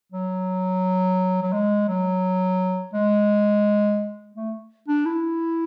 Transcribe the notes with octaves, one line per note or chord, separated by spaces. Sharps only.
F#3
F#3
G#3
F#3
G#3
A3
D4
E4